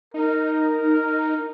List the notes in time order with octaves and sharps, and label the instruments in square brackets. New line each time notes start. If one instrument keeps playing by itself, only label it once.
[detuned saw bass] D#4 [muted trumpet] A#4